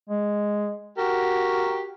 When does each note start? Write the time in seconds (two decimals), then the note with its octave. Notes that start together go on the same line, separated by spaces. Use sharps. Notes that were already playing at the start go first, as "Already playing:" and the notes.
0.09 G#3
0.98 F#4 G4 A#4